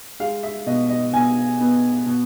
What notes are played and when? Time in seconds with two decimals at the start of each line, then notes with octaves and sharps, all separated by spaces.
0.20 G#3 F5
0.43 E5
0.66 B2 D#5
0.90 D#5
1.13 B2 G#5
1.61 B3
2.06 B2